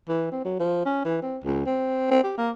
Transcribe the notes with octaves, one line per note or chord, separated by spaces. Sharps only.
E3
C4
F#3
F3
C#4
E3
C4
C#2
C4
C4
G4
A#3